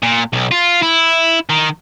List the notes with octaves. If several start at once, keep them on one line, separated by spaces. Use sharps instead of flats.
A#2
B1
F4
E4
D#3